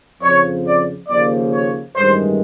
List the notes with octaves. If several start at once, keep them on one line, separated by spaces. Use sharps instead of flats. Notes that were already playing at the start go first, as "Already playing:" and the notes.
F2 C#3 F3 C#5
D5
D#2 C#3 F3 A#3 D5
C#5
A1 G2 D#3 G#3 C5